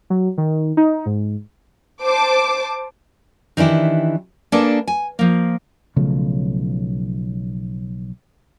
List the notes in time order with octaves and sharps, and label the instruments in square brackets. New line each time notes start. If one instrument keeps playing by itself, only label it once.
[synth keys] F#3
D#3
D#4
G#2
[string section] C5 A5 D6
[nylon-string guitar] D#3 E3 D4 E4 G4
A#3 D4 G#4 A4 B4 D5
G#5
F3 A#3
[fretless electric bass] B1 C#3 F3 A3